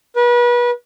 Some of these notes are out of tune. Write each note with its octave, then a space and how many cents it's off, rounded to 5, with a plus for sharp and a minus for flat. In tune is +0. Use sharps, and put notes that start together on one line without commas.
B4 -35